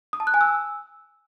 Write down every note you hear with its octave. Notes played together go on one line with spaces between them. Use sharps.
D#6
A5
F#6
G#5
E6